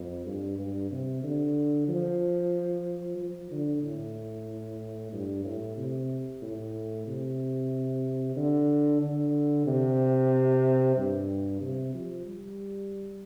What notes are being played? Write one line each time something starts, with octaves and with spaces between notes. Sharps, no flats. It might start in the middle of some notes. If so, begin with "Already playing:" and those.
Already playing: F2
G2
G2
C3
D3
F3
F3
D3
A2
G2
A2
C3
A2
C3
D3
D3
C3
G2
C3
F3
G3